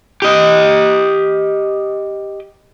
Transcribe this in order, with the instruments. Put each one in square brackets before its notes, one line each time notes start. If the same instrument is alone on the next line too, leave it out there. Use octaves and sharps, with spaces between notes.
[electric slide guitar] G4 D#5